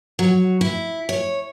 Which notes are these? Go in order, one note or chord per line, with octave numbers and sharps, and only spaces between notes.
F#3
E4
C#5